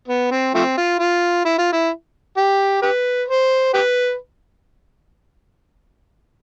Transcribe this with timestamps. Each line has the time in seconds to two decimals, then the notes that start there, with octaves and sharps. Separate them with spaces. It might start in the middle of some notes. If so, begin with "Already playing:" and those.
0.08 B3
0.31 C4
0.54 F3 A3 C4
0.77 F4
0.99 F4
1.45 E4
1.58 F4
1.72 E4
2.37 G4
2.82 G4 B4
3.28 C5
3.74 G4 B4